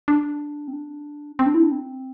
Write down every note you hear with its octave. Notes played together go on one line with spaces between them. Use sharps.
D4
C4
D4
C4
D4
E4
D4
C4